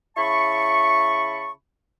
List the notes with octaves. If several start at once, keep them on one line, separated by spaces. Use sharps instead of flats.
C#3 E4 A5 B5 C#6